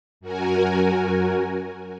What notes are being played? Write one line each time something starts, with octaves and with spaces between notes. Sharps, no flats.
F#2 F#4 A#4 G#5